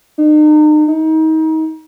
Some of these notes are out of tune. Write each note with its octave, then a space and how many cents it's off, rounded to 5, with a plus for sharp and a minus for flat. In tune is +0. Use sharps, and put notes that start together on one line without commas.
D#4 -40
D#4 +30